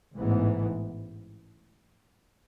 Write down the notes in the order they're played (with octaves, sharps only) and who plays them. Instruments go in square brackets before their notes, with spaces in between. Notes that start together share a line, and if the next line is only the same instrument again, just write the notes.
[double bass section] A1 G#2 E3 B3